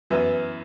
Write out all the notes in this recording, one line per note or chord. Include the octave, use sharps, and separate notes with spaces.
F#2 E3 B3 E4